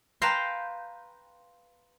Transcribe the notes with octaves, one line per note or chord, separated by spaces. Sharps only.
B4 F5 G5 A5 A#5 C6